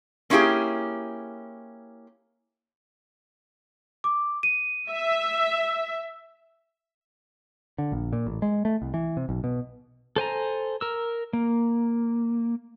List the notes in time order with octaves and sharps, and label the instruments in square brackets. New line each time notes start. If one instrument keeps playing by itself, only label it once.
[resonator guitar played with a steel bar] A#3 C#4 E4 F4 G4 G#4
[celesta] D6
D#7
[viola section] E5
[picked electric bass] D3
A#1
A#2
A1
G#3
A3
C2
E3
C3
B1
B2
[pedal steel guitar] A4 C5 G#5 A#5
A#4 E6
A#3